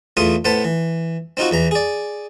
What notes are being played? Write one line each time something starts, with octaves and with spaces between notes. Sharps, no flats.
E2 A3 F4 C6 D#6
A2 B3 C5 A5 B5
E3
C4 D#4 F4 F#4
E2 E3 A#5
G#4 D5